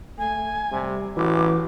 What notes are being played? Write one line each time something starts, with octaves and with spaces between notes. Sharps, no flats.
A3 G#5
C3 G3
A1 E3 F#4 D6